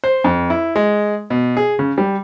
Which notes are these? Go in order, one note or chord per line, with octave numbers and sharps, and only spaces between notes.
C5
F2
E4
G#3
B2
G#4
C#3
G3